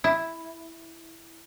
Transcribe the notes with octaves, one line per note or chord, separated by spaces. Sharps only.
E4